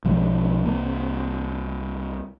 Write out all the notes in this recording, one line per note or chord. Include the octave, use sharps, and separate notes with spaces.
B1 F3 G#3
C2 A#3